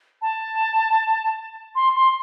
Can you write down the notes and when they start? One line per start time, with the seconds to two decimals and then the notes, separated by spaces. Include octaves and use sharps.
0.22 A5
1.75 C6
1.95 C6